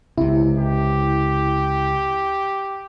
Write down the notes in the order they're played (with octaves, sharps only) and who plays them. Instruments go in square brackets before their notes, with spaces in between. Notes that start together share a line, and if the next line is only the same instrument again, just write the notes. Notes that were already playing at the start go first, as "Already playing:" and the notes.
[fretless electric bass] C#2 C3 [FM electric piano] E4
[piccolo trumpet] G4